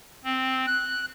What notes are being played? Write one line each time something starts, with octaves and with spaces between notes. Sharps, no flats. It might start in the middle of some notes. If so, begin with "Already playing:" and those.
C4
F#6